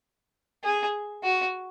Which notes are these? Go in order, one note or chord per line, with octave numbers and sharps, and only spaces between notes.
G#4
F#4